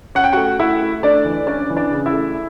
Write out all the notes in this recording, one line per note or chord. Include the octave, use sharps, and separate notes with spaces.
C#4 F#5
G5
A3 F#4 F#5
A3 E4 E5
A3
A3 D4 D5
E3
C#4 D4 D5
E3
D4 D5
C#3
E4 E5
A3